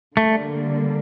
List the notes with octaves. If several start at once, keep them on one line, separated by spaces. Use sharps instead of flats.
D3 G3 A3 A#3